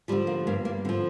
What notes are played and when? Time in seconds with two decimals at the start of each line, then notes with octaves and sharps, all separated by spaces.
0.08 F3 G3
0.12 D3
0.27 A#3
0.47 G2 A#3
0.65 A#3
0.85 D3 C4
0.89 F3